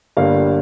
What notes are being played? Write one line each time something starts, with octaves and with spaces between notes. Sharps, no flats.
G1 G2 D3 G3 A#3 F5